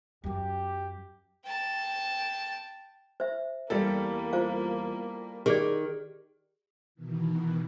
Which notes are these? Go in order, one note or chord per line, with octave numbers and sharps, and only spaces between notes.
F#2 F#3 G4
G5 A5
C5 E5
E2 G3 A#3 A4
F4 C5 F5
D#3 G4 G#4 D5
B2 D#3 E3